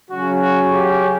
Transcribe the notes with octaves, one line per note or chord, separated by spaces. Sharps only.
C#3 F#3 C#4 F#4
F#4
G4